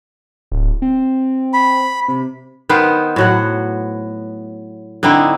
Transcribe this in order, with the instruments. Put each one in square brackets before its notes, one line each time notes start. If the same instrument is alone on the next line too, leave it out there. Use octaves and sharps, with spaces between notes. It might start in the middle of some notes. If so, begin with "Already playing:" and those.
[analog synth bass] D1
C4
[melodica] B5
[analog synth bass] C3
[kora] D#3 B3 B4 C5
A2 F#3 F#5
D3 C4 D#4 E4